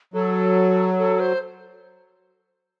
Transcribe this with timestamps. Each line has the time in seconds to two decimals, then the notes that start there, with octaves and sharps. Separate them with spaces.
0.14 F#3 A4
0.99 A4
1.20 C5